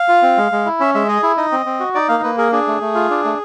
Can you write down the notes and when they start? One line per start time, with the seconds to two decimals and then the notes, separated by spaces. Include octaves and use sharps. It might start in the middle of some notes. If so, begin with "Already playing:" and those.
Already playing: F5
0.08 F4
0.22 C4
0.38 G#3
0.52 G#3
0.66 E4
0.80 C#4 E5
0.95 G#3 E5
1.08 G#4 D#5
1.23 E4
1.37 D#4 D#5
1.52 C4
1.66 C4
1.80 F#4
1.95 D#4 D5
2.09 A#3 F5
2.23 A#3 B4
2.38 G#4 A#4
2.52 D4 G#4
2.67 A3
2.81 A3
2.95 F4
3.10 D4
3.25 A3